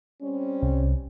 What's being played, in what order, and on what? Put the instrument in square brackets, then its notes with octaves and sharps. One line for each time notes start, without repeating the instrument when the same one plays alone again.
[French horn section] G3 C4 C#4
[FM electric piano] C2